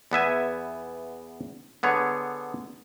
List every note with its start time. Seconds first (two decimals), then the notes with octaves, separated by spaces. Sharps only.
0.11 E2 B3 E5 G#5
1.83 D3 B3 G#4 C#5